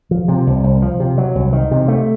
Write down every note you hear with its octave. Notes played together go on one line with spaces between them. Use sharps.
F3
C3
C2
C2
F3
C3
F#3
C2
D#3
C3
A3